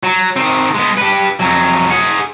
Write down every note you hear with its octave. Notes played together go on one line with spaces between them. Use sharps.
F#3
D#3 C4
G#3 B3
G4 B4
F2 F#3
G#4 F#5